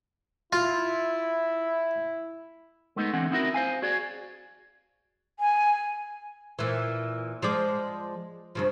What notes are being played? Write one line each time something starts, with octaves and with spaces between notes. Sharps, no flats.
E4 F4
G#3 A3 B3 D#4
D3 E3 C4 F#5
C4 D#4 E4 F#4 A#4
C5 F5 G#5
F#4 G#4 D5
G#5
A#2 E3
F3 G#3 D5
G2 C#3 F3